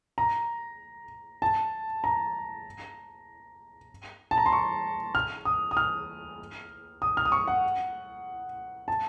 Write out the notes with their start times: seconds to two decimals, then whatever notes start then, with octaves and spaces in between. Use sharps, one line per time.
0.18 A#5
1.42 A5
2.04 A#5
4.31 A5
4.38 A#5
4.46 C6
4.53 C#6
5.15 F6
5.45 D#6
5.71 D#6
5.77 F6
7.02 D#6
7.17 F6
7.25 D#6
7.32 C#6
7.47 F#5
8.88 A5